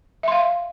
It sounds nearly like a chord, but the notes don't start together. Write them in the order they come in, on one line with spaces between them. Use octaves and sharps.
E5 C6 F5